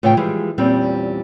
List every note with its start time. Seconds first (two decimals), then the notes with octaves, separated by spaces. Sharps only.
0.03 A2 C#3 E3 F4 C#5 G5
0.17 E3 F3 G3 G#3 G#4
0.58 E2 A#2 G3 C4 C#4